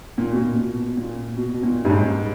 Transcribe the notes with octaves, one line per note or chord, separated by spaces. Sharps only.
A#2
B2
A#2
B2
A#2
B2
B2
A#2
G2
G#2